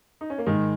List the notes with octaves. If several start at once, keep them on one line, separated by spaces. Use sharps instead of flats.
D#4
C#4
A#3
G#2 D#3 G#3